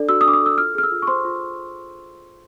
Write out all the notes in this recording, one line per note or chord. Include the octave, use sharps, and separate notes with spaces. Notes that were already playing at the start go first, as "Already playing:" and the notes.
Already playing: D4 A4 D5
F#4 E6
D#6
D4 D6
D#6
A4 E6
F4 F6
G#4 F6
E6
F4
C#6
C5 C6
F4